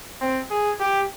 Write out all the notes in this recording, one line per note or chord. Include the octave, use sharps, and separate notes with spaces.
C4
G#4
G4